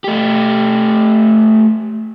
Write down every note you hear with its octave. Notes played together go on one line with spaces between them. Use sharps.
A3 G4